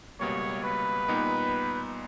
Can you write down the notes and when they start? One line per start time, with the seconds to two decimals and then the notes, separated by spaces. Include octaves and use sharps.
0.20 C#2 B2 G3 A#3 C#5
0.64 B4
1.08 A#2 G3 B3 D#4